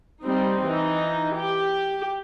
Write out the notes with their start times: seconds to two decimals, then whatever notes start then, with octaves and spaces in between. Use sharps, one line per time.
0.24 G3 C4 D#4
0.63 E3 D#4
1.36 G4